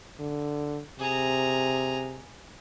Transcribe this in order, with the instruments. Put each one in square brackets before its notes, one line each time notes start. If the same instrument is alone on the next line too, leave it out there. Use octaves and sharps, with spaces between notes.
[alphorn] D3
[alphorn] C3 [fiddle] G#4 A#5